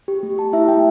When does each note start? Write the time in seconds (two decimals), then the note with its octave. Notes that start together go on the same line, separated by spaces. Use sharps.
0.08 G4
0.23 A3
0.38 G4 A5
0.53 E4 E5
0.68 A3 G5